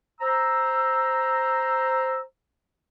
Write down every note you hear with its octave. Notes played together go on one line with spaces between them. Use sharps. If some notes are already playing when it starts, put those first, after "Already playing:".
C5 A#5 E6